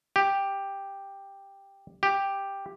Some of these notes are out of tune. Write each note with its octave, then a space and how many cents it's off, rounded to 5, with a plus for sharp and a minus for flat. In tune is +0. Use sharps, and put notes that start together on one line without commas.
G4 +5
G4 +5